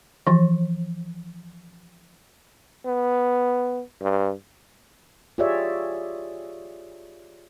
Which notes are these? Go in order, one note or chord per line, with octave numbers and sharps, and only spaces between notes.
E3 F3
B3
G2
F4 G4 G#4 C#5 D5 E5